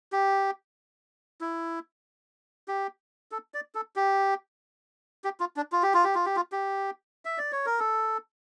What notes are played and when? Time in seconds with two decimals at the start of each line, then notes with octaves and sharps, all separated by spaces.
0.12 G4
1.41 E4
2.68 G4
3.32 A4
3.54 D5
3.75 A4
3.96 G4
5.24 G4
5.40 F4
5.57 D4
5.72 F4
5.83 G4
5.94 F4
6.04 G4
6.15 F4
6.26 G4
6.36 F4
6.52 G4
7.25 E5
7.38 D5
7.52 C#5
7.66 A#4
7.79 A4